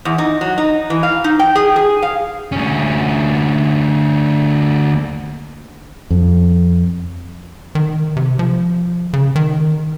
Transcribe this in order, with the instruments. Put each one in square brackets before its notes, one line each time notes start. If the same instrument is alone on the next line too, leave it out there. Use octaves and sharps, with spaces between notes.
[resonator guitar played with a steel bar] E2
D#4
F#3
D#4
E3
F5
D#4
G5
G#4
G#4
F5
[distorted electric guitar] D2 C#4
[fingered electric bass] F2
[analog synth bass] D#3
C3
F3
C#3
D#3